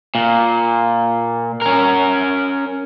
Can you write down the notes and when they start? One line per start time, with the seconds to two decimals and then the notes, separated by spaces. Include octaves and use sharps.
0.15 A#2
1.62 C#4 A#4